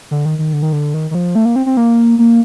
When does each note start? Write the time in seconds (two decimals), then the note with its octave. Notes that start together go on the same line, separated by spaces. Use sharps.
0.11 D3
0.25 D#3
0.39 D#3
0.53 D3
0.62 D#3
0.73 D3
0.94 D#3
1.11 D#3
1.15 F3
1.35 A3
1.45 A#3
1.56 C4
1.66 C4
1.77 A#3
2.19 A#3